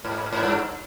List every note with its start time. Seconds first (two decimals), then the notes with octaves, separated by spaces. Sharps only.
0.05 G#2
0.33 G#2
0.43 G2